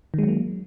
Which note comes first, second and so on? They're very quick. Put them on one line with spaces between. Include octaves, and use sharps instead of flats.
D#3 G#3 F#3 A#3